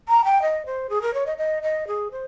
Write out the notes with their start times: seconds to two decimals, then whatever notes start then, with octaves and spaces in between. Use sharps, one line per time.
0.09 A#5
0.25 G5
0.42 D#5
0.66 C5
0.90 G#4
1.02 A#4
1.14 C#5
1.26 D#5
1.38 D#5
1.63 D#5
1.87 G#4
2.11 C5